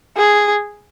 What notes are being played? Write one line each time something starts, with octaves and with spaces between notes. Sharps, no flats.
G#4